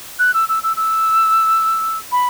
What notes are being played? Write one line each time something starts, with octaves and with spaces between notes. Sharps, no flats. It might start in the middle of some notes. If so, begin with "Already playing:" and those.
F#6
E6
E6
E6
E6
B5